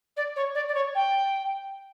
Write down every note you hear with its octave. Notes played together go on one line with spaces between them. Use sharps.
D5
C#5
D5
D5
C#5
G5